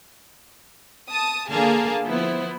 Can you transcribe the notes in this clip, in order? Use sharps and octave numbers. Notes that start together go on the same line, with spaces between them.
A5 D#6
D3 A#3 G#4 F5 A5
F3 B3 E4 C5